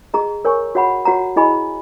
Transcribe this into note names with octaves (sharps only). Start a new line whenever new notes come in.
G#4 D#5 A#5
A#4 C#5 G#5 C#6
F#4 C#5 F#5 B5
F#4 C#5 F#5 A#5
E4 G#4 D#5 G#5 B5